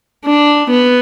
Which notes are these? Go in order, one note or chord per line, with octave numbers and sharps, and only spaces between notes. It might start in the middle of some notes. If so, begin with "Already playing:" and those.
D4
B3